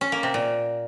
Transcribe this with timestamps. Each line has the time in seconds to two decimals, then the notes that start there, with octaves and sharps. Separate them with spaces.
0.01 C#4
0.12 A#3
0.23 C3
0.34 A#2